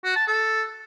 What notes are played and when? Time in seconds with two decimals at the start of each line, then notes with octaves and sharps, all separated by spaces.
0.05 F#4
0.16 A5
0.27 A4